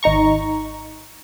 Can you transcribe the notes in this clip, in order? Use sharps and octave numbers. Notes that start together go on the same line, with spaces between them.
G#1 D#4 A#5 C#6